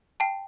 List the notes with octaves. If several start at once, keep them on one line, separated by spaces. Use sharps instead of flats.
G5 A5